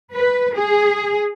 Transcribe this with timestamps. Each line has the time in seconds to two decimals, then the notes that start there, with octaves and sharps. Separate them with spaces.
0.13 B4
0.56 G#4